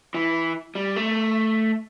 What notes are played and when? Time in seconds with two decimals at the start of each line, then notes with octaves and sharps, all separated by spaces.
0.14 E3
0.75 G3
0.96 A3